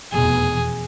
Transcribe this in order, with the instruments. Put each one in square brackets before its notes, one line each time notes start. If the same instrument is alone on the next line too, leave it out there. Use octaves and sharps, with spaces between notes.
[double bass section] F1 E2 B2 [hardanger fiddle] G#4